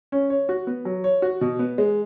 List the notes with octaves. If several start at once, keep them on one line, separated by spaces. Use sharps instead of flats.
C#4
C#5
F#4
B3
F#3
C#5
F#4
B2
B3
G#3